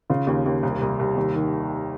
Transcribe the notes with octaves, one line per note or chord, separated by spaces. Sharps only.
C#3 F4
D#2
D#2
C2
C2
C2
D#2
D#3